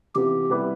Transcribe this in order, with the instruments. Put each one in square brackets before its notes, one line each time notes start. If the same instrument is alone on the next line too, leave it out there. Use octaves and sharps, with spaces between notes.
[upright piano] C3 E3 B3 F4 [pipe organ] G4
[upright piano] C3 G3 B3 E4 B4